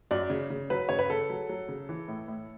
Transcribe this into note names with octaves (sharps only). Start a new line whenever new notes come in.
F#2 D5
C#3
C#3
F#3 B4
C#3 C#5
B4
C#3 A4
F#3
F#3
C#3
E3
A2
A2